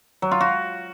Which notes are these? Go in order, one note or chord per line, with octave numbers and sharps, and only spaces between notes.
F#3
F4
F#4